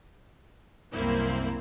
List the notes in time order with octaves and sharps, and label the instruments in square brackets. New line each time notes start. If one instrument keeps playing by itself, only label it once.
[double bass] C2 F#2 [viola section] A#3 C4 E4